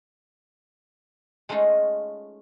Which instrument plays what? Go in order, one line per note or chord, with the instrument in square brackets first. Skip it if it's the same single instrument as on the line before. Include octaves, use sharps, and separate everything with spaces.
[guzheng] G#3 A3 C#4 D#4 F4